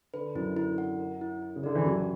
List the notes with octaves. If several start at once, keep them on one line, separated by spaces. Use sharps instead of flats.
D3 B4
F#2 F#3 E4
E4
F#5
A#4
E4
E4
C#3
D3 D5
E3
F#2 F#3 G4